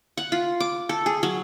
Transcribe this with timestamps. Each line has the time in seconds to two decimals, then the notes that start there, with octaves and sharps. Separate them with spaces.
0.17 F#5
0.32 F4
0.60 D6
0.89 A4
1.06 G#4
1.23 F#3